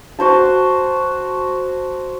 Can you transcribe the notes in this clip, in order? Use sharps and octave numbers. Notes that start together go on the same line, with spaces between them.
F#4 C5 A5